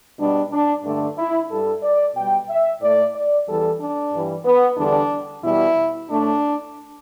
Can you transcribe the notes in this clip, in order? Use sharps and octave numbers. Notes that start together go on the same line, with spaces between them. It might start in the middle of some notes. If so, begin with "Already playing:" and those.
B2 G3 D4
D4
G2 D3 A3 D4
E4
G2 G3 A4
D5
B2 G3 G5
E5
A2 A3 D5
D5
E2 E3 G3 A4
D4
G2 E3 G3
B3
E2 D3 G3 D4
E2 B2 G3 E4
A2 A3 D4